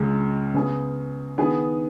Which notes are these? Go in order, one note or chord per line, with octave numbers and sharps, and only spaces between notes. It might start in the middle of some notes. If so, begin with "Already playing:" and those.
Already playing: C#2 C#3 G#3
C#3 B3 G#4
D#3 B3 G#4